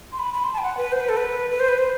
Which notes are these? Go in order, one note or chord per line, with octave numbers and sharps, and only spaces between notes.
C6
B5
B5
C6
A5
G5
F#5
B4
C5
B4
A4
B4
B4
C5
B4
C5